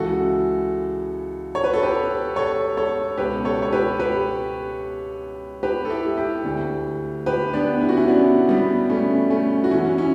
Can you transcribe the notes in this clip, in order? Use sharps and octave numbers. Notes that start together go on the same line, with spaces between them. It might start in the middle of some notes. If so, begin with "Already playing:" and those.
Already playing: C#2 C#3 E3 F#4 A4
C#5
B4
A4
G4 B4
A4 C#5
A4 C#5
C#2 B2 G4 B4
A4 C#5
C#5
G4 B4
G4 B4
G4 B4
A4
E4 G4
E4 G4
D2 D3
G4 B4
B3 D4
E4
F#4
C#4 E4
B3 D4
G3 B3
A3 C#4
A3 C#4
F#4
F#2 E3 C#4 E4
C#4 E4